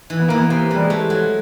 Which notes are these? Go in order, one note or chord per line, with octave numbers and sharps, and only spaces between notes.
E3
B3
E3 A#3
B3
C3 A#3
E3 G3
G#3
A3
F#3